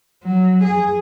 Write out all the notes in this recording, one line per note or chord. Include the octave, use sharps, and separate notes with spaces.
F#3
G#4